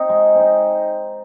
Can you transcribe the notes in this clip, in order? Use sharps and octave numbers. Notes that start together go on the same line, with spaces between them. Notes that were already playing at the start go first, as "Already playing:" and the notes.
Already playing: C4 D#4
G#3
C4 D#4